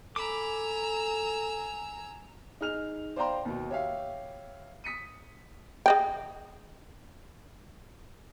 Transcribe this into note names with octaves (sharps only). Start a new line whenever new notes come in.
A4 G#5 A#5 B5 D6 E6
D#4 G#4 F6 F7
C5 D5 F5 G5 A#5 C6
D#2 B2
G4 C#5 E5 F5
D#6 B6 C#7 D#7
G#4 D#5 G5